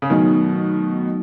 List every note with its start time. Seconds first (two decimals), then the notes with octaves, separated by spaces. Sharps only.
0.02 C#3
0.10 B2 D#3 F#3 A3 D#4 F#4